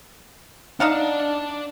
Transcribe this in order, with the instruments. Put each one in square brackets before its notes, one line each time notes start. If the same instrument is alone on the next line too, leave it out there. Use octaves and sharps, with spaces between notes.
[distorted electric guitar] D4 D5 [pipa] D#4 F5 F#5